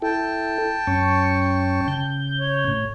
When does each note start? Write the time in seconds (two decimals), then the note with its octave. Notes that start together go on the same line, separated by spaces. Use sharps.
0.02 E4 A4 G5 A5
0.87 F#2 C#4 C#6
1.88 C#3 G6
2.39 C#5
2.68 A2